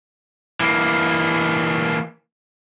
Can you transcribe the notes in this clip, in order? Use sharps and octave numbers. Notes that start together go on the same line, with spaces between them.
E3 A#3